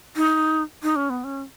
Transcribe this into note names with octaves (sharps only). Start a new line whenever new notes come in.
D#4
D#4
C#4
B3
C#4